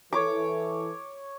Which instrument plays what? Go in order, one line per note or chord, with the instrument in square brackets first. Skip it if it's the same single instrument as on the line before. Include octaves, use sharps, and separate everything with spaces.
[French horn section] E3 A4 [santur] C#5 D6